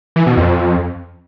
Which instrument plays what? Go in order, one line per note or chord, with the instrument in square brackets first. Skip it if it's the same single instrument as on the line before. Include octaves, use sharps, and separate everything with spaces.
[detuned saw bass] E3
B2
F2